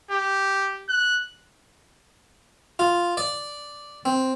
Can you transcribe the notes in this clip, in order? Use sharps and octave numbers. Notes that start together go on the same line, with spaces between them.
G4
F#6
F4
D5
C4